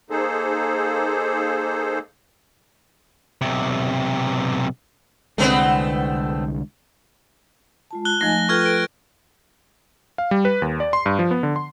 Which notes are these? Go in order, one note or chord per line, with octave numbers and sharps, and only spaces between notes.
A#3 D#4 G#4 A4 C5
B1 C3
C2 D3 G#3 A3 B3 C4
G#3 F4 A5
F#6 G7
F3 A3 D#4 D#5 G#5 A#6
F4 A4 B4 G5 C#6 F6 G#6
D7
F5
G3
B4
D#2
D5
C6
G2
F3
B3
D3
C6